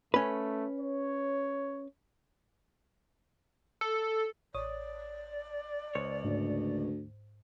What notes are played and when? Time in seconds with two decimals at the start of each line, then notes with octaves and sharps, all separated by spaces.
0.14 A3 C#4 B4
0.81 C#5
3.81 A4
4.54 A1 C#5 D5 D#6
5.95 C#2 C5 C#5
6.24 D2 G#2